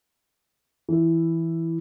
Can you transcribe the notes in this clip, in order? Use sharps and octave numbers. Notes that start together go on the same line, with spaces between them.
E3 E4